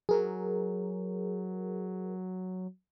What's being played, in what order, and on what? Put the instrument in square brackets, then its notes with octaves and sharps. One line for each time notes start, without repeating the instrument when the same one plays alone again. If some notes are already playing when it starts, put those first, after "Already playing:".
[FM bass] F#3 [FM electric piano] G#4 A#4